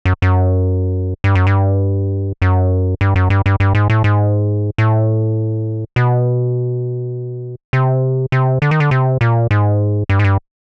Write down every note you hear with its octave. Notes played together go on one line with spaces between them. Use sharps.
F#2
F#2
G2
F#2
G2
F#2
G2
F#2
G2
G2
G2
G#2
A2
G#2
A2
B2
C3
C3
D3
D#3
D3
C3
A#2
G#2
G2
G#2
G2